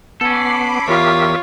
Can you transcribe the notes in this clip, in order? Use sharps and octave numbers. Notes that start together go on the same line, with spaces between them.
B3 C#4 A4 B5 D6 C7
E2 F4 G4 A#4 C#5 E5